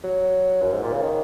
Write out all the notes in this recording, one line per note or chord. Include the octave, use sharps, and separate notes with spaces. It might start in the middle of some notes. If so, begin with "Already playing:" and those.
F#3
F#2
G#2
A#2
C#3
D#3